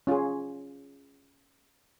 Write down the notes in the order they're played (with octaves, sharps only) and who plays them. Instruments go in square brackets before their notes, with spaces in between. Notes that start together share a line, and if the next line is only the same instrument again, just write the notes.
[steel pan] C#4 F4 G#4